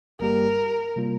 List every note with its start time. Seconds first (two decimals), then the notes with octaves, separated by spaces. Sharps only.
0.20 G1 G2 G3 A#3 G4 A#4
0.96 C3 G3 A#3 F4